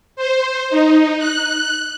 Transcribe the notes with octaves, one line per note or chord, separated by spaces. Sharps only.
C5
D#4
F#6